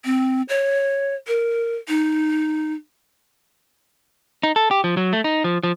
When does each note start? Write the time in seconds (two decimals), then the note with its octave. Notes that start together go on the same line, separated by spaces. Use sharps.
0.05 C4
0.49 C#5
1.28 A#4
1.88 D#4
4.43 D#4
4.56 A4
4.71 G4
4.84 F3
4.97 F#3
5.13 A3
5.24 D#4
5.44 F3
5.63 F3